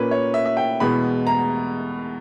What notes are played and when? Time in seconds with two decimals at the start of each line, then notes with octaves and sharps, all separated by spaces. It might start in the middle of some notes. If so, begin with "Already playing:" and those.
Already playing: A#2 A#3 C#4 B4
0.11 C#5
0.34 E5
0.45 E5
0.57 G5
0.80 E2 B2 G#3 B3 B5
1.27 A#5